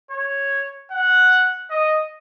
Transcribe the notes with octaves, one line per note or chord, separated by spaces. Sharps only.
C#5
F#5
D#5